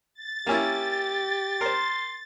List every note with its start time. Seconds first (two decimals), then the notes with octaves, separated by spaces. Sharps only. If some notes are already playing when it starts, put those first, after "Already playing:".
0.14 A6
0.46 A#3 C#4 E4 G4
1.61 A#4 C5 C6